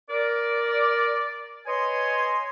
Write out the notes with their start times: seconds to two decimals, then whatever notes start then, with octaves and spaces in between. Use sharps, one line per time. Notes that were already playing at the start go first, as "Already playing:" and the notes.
0.10 A#4 D5
1.67 B4 C#5 D#5 G#5 C6